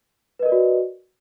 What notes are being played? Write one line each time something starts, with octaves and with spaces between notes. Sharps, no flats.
F#4 A#4 B4 D5 D#5